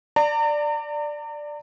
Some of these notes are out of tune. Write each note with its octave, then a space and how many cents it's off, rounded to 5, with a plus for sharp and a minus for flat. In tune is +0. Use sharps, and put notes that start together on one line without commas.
D5 +5 A#5 -40